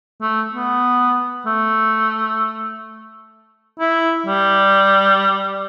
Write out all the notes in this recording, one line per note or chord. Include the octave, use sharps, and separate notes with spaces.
A3
B3
A3
E4
G3